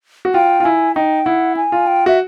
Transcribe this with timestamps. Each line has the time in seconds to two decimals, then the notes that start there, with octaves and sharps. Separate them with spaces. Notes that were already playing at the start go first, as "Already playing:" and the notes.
0.25 F#4
0.34 F4 G5
0.60 F4
0.64 E4 G#5
0.96 D#4 G5
1.26 E4 F#5
1.57 G#5
1.72 F4
1.87 G5
2.06 F#4 E5